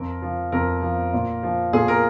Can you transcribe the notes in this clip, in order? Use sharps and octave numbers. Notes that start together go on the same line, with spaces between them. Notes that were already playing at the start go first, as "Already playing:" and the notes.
Already playing: F2 A#4
F3
F2 A#4
F3
A#2
F3
A#2 G#4
A#4